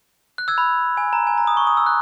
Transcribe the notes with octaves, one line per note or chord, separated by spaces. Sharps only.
F#6
E6 G#6
B5
G#5
A#5
G#5
A#5
D#6
C#6
D#6
E6
F#6